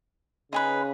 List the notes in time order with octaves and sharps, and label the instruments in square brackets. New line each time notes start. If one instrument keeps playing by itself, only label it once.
[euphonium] C#3 [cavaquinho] D#4 G#4 B4